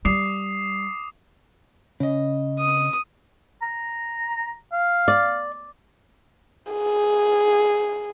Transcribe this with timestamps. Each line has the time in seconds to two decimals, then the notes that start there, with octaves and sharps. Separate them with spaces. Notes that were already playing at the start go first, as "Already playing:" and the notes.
0.05 G3 D6 D#6 C7
2.00 C#3 C#4 D#5
2.59 D#6
3.62 A#5
4.72 F5
5.08 D5
6.72 G#4